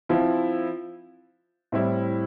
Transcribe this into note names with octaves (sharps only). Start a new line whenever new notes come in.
F3 C4 E4
A2 G3 C4 E4